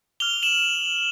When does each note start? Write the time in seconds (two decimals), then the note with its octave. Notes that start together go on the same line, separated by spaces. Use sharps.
0.20 D6 F6 F7 G7
0.43 E7 F#7